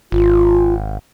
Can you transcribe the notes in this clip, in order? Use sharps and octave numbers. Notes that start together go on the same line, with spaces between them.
G#1 F4